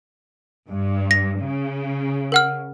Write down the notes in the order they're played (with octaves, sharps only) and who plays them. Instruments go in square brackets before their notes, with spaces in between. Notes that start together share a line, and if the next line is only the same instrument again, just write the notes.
[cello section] G2
[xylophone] A#6
[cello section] C#3
[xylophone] A#4 F#5 F6